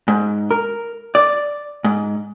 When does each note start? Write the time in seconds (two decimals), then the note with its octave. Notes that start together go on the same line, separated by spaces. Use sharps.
0.08 G#2
0.51 A#4
1.15 D5
1.84 G#2